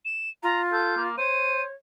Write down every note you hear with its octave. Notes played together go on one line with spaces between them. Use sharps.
E7
F4 A#5
A4 G6
A#3
C5 C#5 D#7